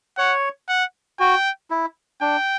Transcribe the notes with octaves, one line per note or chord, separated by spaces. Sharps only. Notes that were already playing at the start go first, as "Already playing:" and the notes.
C#5 F#5
F#5
F#4 G5
E4
D4 G5